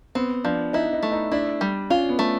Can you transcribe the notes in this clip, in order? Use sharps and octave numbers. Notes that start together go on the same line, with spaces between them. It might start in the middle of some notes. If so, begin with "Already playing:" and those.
B3 C4
F3 D4
D#4 E4
D#4
A3
D#4
D4 E4
G3
C#4 F4
B3
A3